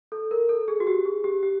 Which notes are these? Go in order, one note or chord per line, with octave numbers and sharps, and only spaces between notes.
A4
A#4
A4
G#4
F#4
G4
G#4
G4
G4